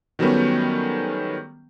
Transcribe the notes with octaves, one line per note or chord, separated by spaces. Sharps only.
D#3 F#3 G3 A3 B3 C#4